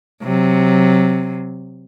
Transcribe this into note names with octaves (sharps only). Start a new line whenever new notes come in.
C3 F#3